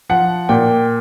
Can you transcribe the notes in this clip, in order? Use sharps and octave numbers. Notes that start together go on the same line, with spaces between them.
F3 F#5
A#2 G5